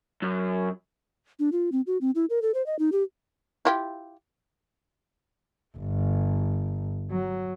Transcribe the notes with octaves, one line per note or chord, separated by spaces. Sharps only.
F#2
D4
F4
C4
F#4
C4
E4
A#4
A4
C5
D#5
D#4
G4
E4 F4 G4
G1
F#3